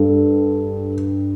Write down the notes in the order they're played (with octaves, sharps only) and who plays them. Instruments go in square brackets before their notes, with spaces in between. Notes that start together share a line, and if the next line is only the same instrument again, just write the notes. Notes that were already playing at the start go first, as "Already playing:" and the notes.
Already playing: [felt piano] G2 A4